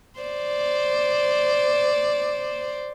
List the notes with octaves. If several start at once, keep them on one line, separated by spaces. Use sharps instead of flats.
C5 D5